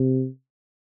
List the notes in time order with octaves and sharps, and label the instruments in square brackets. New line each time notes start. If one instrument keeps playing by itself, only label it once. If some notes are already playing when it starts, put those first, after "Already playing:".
Already playing: [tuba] C3